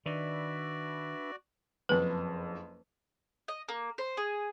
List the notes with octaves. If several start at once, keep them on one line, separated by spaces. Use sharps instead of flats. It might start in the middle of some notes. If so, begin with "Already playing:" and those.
D#3 D4 F#4 B4 D5 E5
F#1 F2 B4
D#5
A#3
C5
G#4